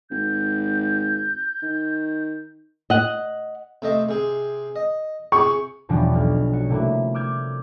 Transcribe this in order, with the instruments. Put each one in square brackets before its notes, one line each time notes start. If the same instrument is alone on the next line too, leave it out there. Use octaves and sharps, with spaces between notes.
[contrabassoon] G#1 [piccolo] G6
[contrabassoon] D#3
[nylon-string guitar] D#5 F#5
[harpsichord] C3 A3 D#5
C3 G#4
D#5
[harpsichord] C3 G#4 [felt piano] C#6
[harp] E2 B2 F3 G3 C#4 D4
B1 F6
F#4 C#7
C3 A3 A#3 E4 F#4 B4
D6 E6 F6 G6 G#6